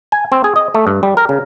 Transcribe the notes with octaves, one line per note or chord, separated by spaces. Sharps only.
G#5
C4
G#4
D#5
A3
G2
G3
A#4
C#3